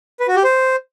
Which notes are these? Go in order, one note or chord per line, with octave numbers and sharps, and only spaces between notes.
B4
F#4
G4
C5